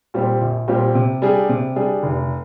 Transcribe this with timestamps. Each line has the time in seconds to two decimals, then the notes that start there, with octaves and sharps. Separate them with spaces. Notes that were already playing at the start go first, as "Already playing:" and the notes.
0.14 A#2 G3 C4 G4
0.41 A#1
0.68 A#2 G3 C4 G4
0.95 C3
1.22 G3 D4 G#4
1.49 C3
1.76 G3 D4 G#4
2.03 F1